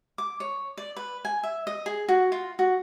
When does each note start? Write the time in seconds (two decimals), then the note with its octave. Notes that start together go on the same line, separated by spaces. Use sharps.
0.18 D6
0.40 C#5
0.77 D5
0.96 B4
1.25 G#5
1.43 E5
1.67 D#5
1.86 G#4
2.09 F#4
2.32 F4
2.59 F#4